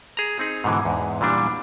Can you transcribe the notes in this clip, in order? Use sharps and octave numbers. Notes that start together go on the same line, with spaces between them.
G#4 A#5
C4 D#4 G#4
G#2 B2 D3 E3
E2 G#2
A#2 E3 G3 D4